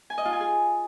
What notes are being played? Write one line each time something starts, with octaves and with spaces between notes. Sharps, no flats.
G#5
D#5
F4
G#5
G#4